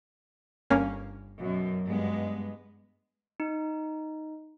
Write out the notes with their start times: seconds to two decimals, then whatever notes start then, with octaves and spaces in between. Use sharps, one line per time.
0.70 G1 A#3 C#4
1.39 F#2 B2
1.86 G2 G#3 B3
3.40 D#4